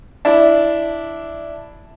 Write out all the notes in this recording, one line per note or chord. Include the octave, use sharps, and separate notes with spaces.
D4 E4